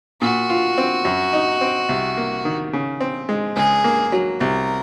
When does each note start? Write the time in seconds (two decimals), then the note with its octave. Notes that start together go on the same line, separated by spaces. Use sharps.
0.21 A#2 F#4
0.50 F4
0.78 C4
1.05 F#2
1.33 D#4
1.61 C4
1.89 C2
2.17 A#3
2.45 D#3
2.73 C#3
3.01 C4
3.29 G#3
3.56 C#2 G#4
3.84 A#3
4.12 F#3
4.40 C2 A#4